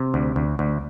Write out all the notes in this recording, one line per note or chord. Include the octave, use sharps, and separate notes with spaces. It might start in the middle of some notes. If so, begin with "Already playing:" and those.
Already playing: C3
D2
D2
D2